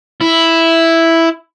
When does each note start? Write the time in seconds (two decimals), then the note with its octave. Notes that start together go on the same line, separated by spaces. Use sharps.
0.21 E4